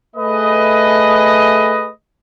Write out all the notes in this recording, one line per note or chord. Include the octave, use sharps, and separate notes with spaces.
A3 G#4 B4 D#5